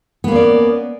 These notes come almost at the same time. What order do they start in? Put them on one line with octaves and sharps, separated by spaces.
B3 A#3 C#4 D5